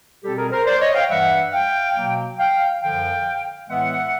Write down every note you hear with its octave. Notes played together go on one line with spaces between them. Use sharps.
B2 G3 C4 G4 A4
G#4 A#4
A#4 C5
C5 D5
C#5 D#5
F5 G5
G2 E3 G3 E5 F#5
F5 G5
B2 F#3 A#3
F5 G5
F#2 D3 F3 F5 G5
A2 E3 G#3 B3 E5 F#5